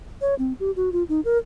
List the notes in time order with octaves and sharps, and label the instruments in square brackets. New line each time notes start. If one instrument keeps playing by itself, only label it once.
[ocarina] C#5
C4
G4
F#4
F4
D#4
A#4